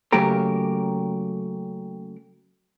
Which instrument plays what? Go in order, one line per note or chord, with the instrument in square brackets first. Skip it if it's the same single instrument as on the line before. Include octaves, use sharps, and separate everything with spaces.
[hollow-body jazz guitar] C#3 F#3 A3 A#3 G4 A#4